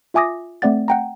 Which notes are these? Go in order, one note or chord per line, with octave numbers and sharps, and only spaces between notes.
F4 E5 G#5 D6 D#6 A#6
A3 C4 D5 F#5 A6
F#5 G5 A#5